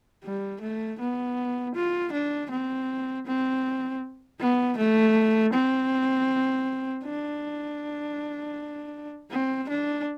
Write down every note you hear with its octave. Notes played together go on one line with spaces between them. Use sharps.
G3
A3
B3
F4
D4
C4
C4
B3
A3
C4
D4
C4
D4